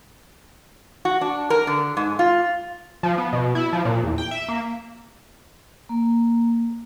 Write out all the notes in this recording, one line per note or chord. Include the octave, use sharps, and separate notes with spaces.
F#4
D4
A#4
D3
G#2
F4
F3
B3
B2
E4
F3
A#2
E2
G5
E5
A#3
A#3